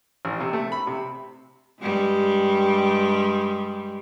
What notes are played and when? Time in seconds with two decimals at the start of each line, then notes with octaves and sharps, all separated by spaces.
0.25 A1
0.40 C3
0.53 A3
0.72 B5
0.87 C3
1.81 G2 G3 G#3